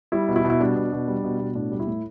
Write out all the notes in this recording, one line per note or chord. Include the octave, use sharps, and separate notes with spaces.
G3 E4
B2
E4
B2
E4
G3 D4
B2
B2
G3
B2
B2
A2 D4
G3
E4
A2